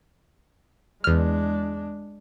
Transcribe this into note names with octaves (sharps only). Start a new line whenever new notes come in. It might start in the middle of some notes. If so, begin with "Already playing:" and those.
E2 G#3 D4 F6